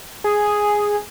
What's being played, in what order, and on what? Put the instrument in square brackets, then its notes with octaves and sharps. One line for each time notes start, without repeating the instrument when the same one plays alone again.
[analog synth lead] G#4